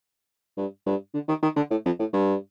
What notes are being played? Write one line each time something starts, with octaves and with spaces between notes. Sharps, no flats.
G2
G2
D3
D#3
D#3
D3
A2
F2
A2
G2